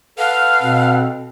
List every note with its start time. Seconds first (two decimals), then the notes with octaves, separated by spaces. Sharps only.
0.18 A4 B4 F5 F#5
0.60 B2 C4